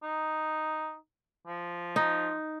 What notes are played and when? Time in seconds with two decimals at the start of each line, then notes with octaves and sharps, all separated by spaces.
0.03 D#4
1.47 F3
1.96 D#4